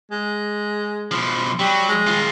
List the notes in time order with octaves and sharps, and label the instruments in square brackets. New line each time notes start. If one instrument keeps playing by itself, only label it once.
[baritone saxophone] G#3
[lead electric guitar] B2 F3
[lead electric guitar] F#3 [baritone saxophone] G3
[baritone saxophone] G#3
[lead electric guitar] D#3 F4